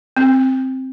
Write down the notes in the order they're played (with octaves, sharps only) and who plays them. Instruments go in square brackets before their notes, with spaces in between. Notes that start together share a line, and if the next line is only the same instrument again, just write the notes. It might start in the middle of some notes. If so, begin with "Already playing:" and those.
[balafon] C4